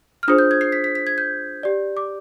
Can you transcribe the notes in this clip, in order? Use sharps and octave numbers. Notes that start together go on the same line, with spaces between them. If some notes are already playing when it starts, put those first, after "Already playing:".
F6
D4 F4 G#4 C5 D#6
G6
G#6
C7
B6
B6
B6
G#6
G6
G4 D5
D6